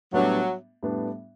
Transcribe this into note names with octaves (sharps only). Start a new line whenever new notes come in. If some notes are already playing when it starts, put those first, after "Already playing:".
A2 F#3 G3 B3 D4
A2 G3 B3 D4